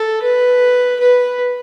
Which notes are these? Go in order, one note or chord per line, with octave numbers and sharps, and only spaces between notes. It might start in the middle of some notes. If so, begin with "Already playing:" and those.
Already playing: A4
B4
B4